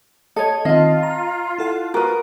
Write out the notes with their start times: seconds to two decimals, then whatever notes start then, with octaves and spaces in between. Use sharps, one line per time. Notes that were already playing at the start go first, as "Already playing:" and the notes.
0.36 A4 C#5 D#5 D#6 G#6
0.65 D#3 C4 F4 D#5 F5 A5
1.03 A#5
1.58 E4 A4 F#5
1.94 F#4 A#4 B4 D#6